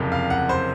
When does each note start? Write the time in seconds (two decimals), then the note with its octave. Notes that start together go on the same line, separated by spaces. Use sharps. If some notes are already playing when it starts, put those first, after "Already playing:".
Already playing: F#1 F2 C3
0.12 F5
0.30 F#5
0.49 C5